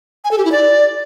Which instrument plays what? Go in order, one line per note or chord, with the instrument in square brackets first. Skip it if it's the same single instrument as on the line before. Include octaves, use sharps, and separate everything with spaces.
[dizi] G#5
A4
G4
E4
D5